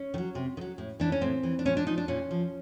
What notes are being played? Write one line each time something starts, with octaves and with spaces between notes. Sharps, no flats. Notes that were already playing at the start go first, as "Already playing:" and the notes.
Already playing: C#4
D#3
F#3
C3
D#3
F#3
A2
E3 D4
C#4
A2 C4
E3
D4
A#2 C#4
D4
F3 D#4
D4
A#2 C#4
F3